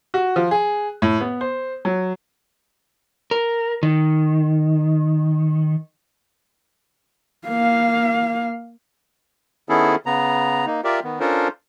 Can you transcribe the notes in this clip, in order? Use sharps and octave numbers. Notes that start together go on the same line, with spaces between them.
F#4
F3
G#4
A2
B3
C5
F#3
A#4
D#3
A#3 F5
D#3 B3 C#4 E4 G#4 A4
C#3 B3 A#5
A#3 D#4
F4 G4 A#4 D5 E5
D#3 B3
C#4 D4 F4 A4 A#4 C5